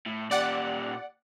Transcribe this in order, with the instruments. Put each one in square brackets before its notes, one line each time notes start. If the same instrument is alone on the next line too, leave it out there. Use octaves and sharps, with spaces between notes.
[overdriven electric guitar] A2
[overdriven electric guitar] A#2 G4 [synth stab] D5 F#5